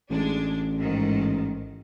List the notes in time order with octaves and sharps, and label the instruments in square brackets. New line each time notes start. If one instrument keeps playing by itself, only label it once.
[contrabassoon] A1 [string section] G#3 D4
[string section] G#2 D#3